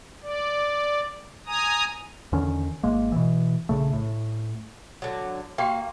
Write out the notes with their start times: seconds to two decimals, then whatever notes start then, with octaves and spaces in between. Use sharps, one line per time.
0.22 D5
1.47 G#5 A#5 D#6
2.32 E2 D3 D#3 C#4
2.83 G#1 G#3 A#3
3.12 B2 E3
3.69 A#1 C#3 A3
3.93 A2
5.02 D3 F#3
5.58 A#3 F#4 G4 G5